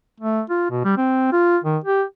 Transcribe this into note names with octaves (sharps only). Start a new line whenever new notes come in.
A3
F4
B2
G3
C4
F4
D#3
G4